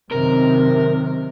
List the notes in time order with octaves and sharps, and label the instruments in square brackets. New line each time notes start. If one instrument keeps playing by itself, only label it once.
[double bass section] F#2 C3 D#3 [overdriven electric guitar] A#4